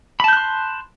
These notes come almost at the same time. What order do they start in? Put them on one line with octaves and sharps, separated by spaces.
B5 A5 G6 F#6 C6